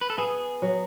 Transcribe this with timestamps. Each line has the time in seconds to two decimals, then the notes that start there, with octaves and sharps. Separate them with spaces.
0.01 B4
0.10 A4
0.18 B3 G#4
0.62 F#3